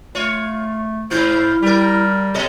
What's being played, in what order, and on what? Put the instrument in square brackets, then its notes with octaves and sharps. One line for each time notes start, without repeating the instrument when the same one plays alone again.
[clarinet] A3 [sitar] F4 C#5
[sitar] G#2 B2 F4 [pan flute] E4 [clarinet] C5
[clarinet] G3 [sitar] G4 A#4
[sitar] B2 A4 D#5 [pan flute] C#5